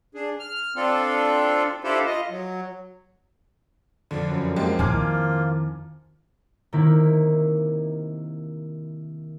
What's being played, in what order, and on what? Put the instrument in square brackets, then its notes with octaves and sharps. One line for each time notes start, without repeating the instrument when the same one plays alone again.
[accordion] D4 G#4
F6
C4 D4 F4 A4
D4 E4 F4 G4 A4 C5
F4 D#5
F#3
[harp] F2 F3 D4 [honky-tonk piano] D3
[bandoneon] F#2
[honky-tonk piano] G#3 A#3 G4 [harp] C4 C5 A5
[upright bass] D#3 E4 [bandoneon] A#3 F4 [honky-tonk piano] G#5 D6 F6
[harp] C3 D#3 A#3 E4